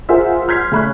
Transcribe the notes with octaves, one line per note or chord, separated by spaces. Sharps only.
F4 G#4 A#4 C5 E5 F#5
C6 F6 G6 G#6 B6 C7
C#3 A3 B5 C#6 F#6